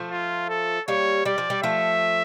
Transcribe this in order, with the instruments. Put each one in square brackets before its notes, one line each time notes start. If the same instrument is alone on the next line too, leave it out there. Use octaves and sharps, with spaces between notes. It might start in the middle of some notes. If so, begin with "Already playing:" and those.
Already playing: [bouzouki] F3 A3
[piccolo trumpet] F4
A4
[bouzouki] G3 A#3 [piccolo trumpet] C#5
[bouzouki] G3 [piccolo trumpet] D5
[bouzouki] F3
G3
[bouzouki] F3 A3 [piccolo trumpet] E5